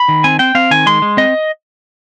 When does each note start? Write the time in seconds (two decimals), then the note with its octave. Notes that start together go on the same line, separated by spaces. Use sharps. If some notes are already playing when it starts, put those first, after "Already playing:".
Already playing: B5
0.08 D#3
0.24 C4 G#5
0.39 C4 G5
0.55 C4 F5
0.71 D#3 G#5
0.86 G#3 C6
1.02 G#3
1.17 C4 D#5